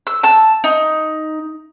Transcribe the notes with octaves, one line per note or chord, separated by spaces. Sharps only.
E6
A5 E6
D#4